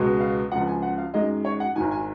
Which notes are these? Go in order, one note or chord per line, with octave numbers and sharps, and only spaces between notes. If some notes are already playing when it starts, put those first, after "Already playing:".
Already playing: C#2 B2 G#3 B3
F5
C#2 C#3 F3 F#5
G#5
F#5
F5
F#2 D#3 G#3 D#5
C#5
F#5
G#1 G#2 D#3 G#5
G#5